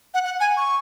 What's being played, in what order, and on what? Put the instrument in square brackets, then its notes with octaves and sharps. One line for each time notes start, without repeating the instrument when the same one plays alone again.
[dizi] F#5
F#5
G#5
C#6